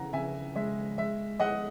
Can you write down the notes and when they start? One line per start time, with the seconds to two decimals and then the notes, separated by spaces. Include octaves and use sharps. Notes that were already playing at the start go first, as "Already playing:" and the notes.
Already playing: C#3 E3 F#5 A#5
0.13 C#3 E5 G#5
0.56 G#3 E5
0.98 G#3 E5
1.40 G#3 D#5 F#5